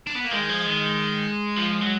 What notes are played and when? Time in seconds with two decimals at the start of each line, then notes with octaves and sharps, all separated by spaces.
0.07 D4
0.16 B3
0.24 A#3
0.32 D#3 G#3
0.49 F3
0.66 D#3
1.57 F3
1.82 F#3